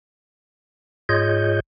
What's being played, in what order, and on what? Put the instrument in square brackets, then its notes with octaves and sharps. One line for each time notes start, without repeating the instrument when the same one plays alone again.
[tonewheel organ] G#2 F4 G#4 C#5 D#5 G6